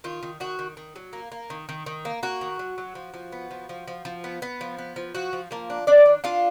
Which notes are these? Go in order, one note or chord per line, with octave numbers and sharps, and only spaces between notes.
D#3 F4
D#3
D#3 F#4
D#3
D#3
F#3
A#3
A#3
D#3
D#3
D#3
A#3
A#3 F#4
D#3
F#3
F#3
F3
F3
B3
F3
F3
F3
F3
B3
B3
F3
B3
F3
F3 F#4
F3
F3 A#3 A#4
D4
D#3 D4 D5
D4
D4 F4 F5